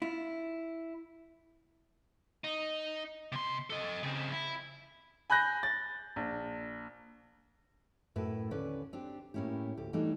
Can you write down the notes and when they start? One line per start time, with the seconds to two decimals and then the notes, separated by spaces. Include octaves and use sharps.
0.02 E4 F4
2.44 D#4
3.32 C3 C6
3.70 A4 D#5
4.03 C#3 C4
4.32 E4
5.30 G#5 B5 F#6 G6 A#6
5.63 A6
6.16 A#1
8.16 F#2 A2 E4 B4
8.51 D#2 D3 C#4 B4 D5
8.93 C4 D4 G4
9.34 A2 A#3 C#4 E4 G4
9.77 D2 G4
9.93 E3 F#3 G3 A3 D4 D#4